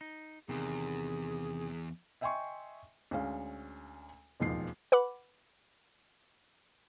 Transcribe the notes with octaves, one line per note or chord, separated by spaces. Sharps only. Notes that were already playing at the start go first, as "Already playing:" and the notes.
D#4
E2 C3 D#3 G#4
D#5 E5 G5 G#5 C6 C#6
D2 G#3 C#4 F5
E1 A1 D#2 F3 C7
B4 F#5 B5 D6